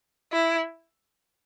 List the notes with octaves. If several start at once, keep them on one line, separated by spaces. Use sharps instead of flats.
E4